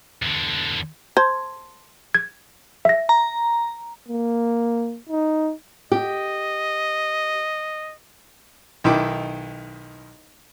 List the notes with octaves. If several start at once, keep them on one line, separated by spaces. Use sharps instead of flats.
E2 D3
C5 A5 C6 G#6
G#6
E5 A#6
A#5
A#3
D#4
G4 D#5
B1 D#3 E4 G5 D6